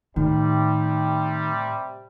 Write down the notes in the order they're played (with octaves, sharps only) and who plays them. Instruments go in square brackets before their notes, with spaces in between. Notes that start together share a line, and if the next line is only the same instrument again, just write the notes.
[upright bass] A2 [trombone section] C3 G3 [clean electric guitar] D#3